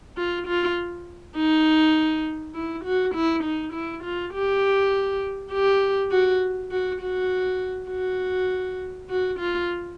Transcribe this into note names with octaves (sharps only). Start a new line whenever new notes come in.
F4
F4
D#4
E4
F#4
E4
D#4
E4
F4
G4
G4
F#4
F#4
F#4
F#4
F#4
F4